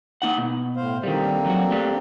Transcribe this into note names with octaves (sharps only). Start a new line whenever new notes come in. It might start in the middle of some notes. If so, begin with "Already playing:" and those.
A#3 D#4 F#5
B2
A2 C5 F5
D3 D#3 G3 A#3 C4
F#3 F#4
A3 D4 G4